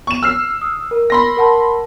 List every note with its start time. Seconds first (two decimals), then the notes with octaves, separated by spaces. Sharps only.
0.07 C#6 E7
0.23 E6 F6 C7
0.61 D#6
0.91 A#4
1.10 B5 C6 A#6
1.37 A#4 F#5 A5